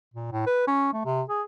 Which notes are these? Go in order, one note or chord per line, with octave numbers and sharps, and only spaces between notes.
A#2
A2
B4
C#4
A3
C3
G#4